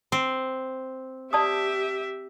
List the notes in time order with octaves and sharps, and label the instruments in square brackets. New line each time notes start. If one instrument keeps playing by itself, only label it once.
[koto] C4
[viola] G4 E5 [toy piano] D5 A5 D#6